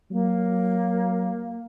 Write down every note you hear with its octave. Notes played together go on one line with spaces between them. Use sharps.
F#3 A#3